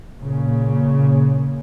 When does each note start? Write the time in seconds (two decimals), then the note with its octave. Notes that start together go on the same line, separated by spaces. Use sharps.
0.21 A#2 C#3